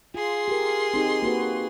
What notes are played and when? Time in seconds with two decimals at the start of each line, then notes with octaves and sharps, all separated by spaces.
0.14 F4 G#4 C6
0.48 G4 A#4
0.94 C4 D#4 G4
1.22 A#3 F#4 B4